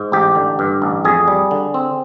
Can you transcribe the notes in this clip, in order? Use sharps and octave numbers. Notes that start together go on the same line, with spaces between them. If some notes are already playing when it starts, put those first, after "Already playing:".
Already playing: G#2
A1 G4
D3
G2
A1
F2 G#4
G3
D3
C4